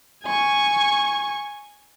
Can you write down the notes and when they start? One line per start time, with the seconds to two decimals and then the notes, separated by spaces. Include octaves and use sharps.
0.23 G#5 C#6